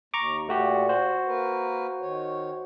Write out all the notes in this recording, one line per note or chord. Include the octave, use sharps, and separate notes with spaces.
D#2 A#5 C#6 D6
A#2 A3 F#4 G4
F#4 C5
A#3 A#4 B4
D#3 C#5